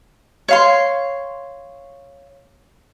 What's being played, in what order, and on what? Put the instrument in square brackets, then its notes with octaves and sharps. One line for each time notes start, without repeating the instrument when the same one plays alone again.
[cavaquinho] C#5 F5 C6